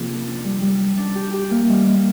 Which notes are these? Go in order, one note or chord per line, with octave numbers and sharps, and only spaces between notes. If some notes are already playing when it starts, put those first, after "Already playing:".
Already playing: C3 F3 A#3 C4 G#4
D4
D4
G3
G3
D4
D4
G4
G4
A#3
G3
A#3